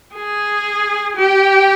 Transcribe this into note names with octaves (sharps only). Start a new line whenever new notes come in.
G#4
G4